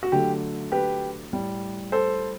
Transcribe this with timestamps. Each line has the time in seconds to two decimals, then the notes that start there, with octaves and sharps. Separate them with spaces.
0.03 F#4
0.12 D3 F#3 A3 G4
0.72 G4 B4
1.32 A2 G3
1.92 A4 C5